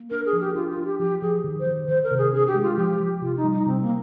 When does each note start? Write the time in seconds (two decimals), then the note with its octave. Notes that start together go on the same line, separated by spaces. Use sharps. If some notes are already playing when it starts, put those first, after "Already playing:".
Already playing: A#3
0.10 D4 A#4
0.26 G#4
0.33 F3
0.40 G4
0.55 D4 F4
0.70 F4
0.77 D4
0.85 G4
0.99 F3 G4
1.22 F3 G#4
1.44 D#3
1.60 C5
1.67 D#3
1.88 D#3 C5
2.04 A#4
2.11 C3
2.18 G#4
2.33 D4 G#4
2.47 G4
2.55 G#3
2.63 F4
2.77 F3 G4
3.00 F3
3.22 C3 F4
3.37 D#4
3.44 G3
3.52 D#4
3.66 C3 C4
3.81 A#3